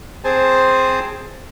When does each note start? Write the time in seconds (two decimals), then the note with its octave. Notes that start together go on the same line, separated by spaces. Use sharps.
0.24 C4 G#4 C5 G#5 A5